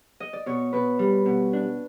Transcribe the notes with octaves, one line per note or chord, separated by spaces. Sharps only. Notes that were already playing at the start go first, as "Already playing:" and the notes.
D#5
D5
B2 C#5
B2 B4
G3
B2
D4